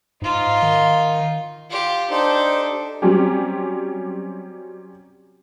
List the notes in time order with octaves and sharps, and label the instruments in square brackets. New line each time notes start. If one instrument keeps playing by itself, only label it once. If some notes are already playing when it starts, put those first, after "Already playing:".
[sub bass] G#2 [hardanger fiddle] D#4 F4
[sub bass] D#3
[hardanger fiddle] F4 G4
[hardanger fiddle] D4 A4 [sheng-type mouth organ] D#4 G4 C5
[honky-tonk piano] F#3 G3 C4 C#4 G4